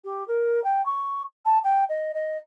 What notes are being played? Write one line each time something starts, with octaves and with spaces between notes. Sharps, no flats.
G4
A#4
G5
C#6
A5
G5
D#5
D#5